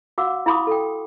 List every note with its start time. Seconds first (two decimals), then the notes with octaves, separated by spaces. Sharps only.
0.18 F#4 F5 F#5 D6 E6
0.46 E4 F5 B5 C6 D6 D#6
0.67 A4 G5